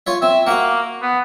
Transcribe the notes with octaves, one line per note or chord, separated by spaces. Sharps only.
F4 C#5 E5
C4 E5
A#3 F#4 E5 F#5
B3